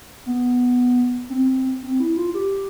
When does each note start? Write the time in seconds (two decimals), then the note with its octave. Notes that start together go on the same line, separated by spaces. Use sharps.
0.26 B3
1.30 C4
1.83 C4
2.00 E4
2.17 F4
2.34 G4